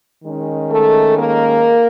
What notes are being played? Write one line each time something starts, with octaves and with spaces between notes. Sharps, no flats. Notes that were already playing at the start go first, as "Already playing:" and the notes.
D#3 G#3 C#4
A3 A4
A#3 A#4